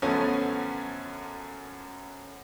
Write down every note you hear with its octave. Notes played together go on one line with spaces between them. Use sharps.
F#2 D3 F3 A3 B3 C#4